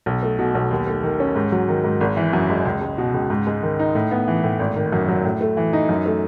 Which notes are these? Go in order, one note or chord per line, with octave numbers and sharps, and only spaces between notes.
B1
A3
B2
B1
D#2
A3
D#3
C#4
G#2
F#3
D#3
G#2
G#1
E3
F#2
G#3
C#2
G#3
B2
C#2
G#2
G#3
D#3
D#4
A2
B3
E3
A2
G#1
D#3
F#2
F#3
A2
A3
E3
D#4
F#2
A3